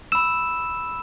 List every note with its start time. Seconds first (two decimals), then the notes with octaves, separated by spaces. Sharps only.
0.12 B5 E6 E7